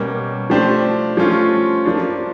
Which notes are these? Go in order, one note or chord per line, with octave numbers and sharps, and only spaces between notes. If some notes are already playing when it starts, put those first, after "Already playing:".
Already playing: B2 G3 A#3 C#4
F3 A3 D4 G4 C5
F3 A3 C#4 F4
F3 A#3 D4